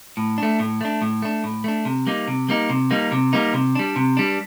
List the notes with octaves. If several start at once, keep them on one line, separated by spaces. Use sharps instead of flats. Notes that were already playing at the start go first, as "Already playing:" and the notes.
A2
A3 D4
A2
A3 D4
A2
A3 D4
A2
A3 D4
C3
G3 A#3 D#4
C3
G3 A#3 D#4
C3
G3 A#3 D#4
C3
G3 A#3 D#4
C3
G3 D4
C3
G3 D4